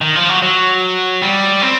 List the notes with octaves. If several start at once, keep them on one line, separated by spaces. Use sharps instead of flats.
D#3
F3
F#3
F#3
G3
C4